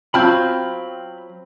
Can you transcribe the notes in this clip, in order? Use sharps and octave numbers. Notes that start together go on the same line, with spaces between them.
F#3 C4 F4 G5 A5 B5 F6 G6